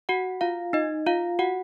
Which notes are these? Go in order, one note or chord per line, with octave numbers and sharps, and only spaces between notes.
F#4 F#5
F4 F5
D#4 D#5
F4 F5
F#4 F#5